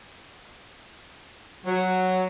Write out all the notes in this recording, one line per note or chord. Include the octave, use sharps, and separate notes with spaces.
F#3